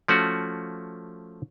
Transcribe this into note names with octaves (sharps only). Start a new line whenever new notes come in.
F3 A3 C#4 F#4